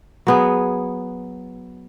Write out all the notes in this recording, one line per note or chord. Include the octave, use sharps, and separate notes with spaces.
F#3 B3 G#4